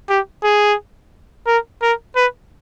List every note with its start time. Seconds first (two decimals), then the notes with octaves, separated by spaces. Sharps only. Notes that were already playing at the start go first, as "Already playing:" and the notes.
0.10 G4
0.43 G#4
1.47 A#4
1.82 A#4
2.16 B4